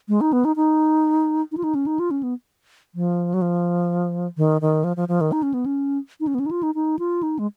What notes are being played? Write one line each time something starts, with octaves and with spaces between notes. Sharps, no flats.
G#3
D#4
B3
D#4
D#4
D#4
F4
D#4
C#4
D#4
F4
C#4
B3
F3
F#3
F3
D#3
D#3
F3
F3
F3
D#3
D#4
C#4
B3
C#4
D#4
C#4
B3
C#4
D#4
F4
D#4
D#4
F4
D#4
G#3